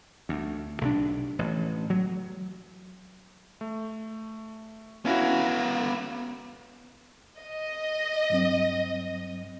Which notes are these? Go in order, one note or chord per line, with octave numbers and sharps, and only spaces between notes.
D2
B1 C3 D4
A1
F#3
A3
B3 C#4 E4 F#4 F5
D#5
G2 F#3 C4